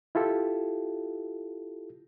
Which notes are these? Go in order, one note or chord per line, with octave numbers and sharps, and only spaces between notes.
E4 F4 G4 A4